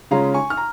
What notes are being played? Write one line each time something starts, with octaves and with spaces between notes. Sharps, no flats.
C#3 G#3 C#4 F4 F5 A#5
G#5 C#6
F6
A#5